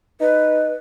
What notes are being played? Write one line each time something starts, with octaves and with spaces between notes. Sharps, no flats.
D#4 B4